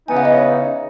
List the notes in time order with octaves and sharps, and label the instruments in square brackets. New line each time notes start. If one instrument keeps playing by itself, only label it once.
[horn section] C#3 E3 B3 D#4 [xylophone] G#5
[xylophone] F#5
D#5
C#5